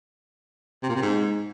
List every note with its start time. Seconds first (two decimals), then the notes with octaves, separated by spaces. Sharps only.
0.82 C3
0.89 A#2
0.95 C3
1.02 G#2